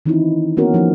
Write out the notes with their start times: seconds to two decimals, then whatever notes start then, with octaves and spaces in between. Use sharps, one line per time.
0.06 D#3 E3 C4 C#4 D#4 E4
0.57 A#3 B3 C#4 F#4 A#4
0.74 E3 F3 A3 D#4 G4